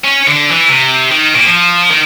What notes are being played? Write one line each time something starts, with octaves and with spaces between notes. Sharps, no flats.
C#4
D3
E3
C3
D#3
A#2
F3
D#3